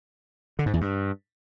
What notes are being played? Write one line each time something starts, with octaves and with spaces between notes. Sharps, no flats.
D3
G#2
E2
G2